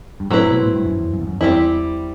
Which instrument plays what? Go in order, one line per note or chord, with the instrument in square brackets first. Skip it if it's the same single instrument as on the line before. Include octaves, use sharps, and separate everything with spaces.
[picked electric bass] G2
[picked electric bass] A2 [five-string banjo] F#3 C4 E4 B4
[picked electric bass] B2
A2
G2
F#2
E2
F#2
E2
F#2
[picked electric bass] E2 [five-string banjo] G3 C4 E4